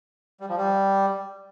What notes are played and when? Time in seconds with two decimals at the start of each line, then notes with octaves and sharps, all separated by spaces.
0.40 G3
0.49 F3
0.57 G3